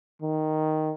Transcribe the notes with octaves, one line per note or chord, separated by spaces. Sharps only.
D#3